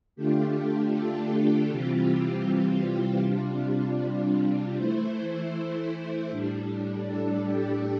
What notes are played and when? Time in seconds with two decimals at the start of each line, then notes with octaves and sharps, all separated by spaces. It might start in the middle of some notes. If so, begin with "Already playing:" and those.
0.16 D3 A3 D4 F4 G4
0.93 A4
1.69 C3 E3 G3 C4 F4 G4
2.07 F4
2.46 G4
3.23 C3 G3 D4 F4
4.76 E3 A3 E4 C5
5.53 C5
6.30 A2 G3 D4
7.07 A4
7.45 G4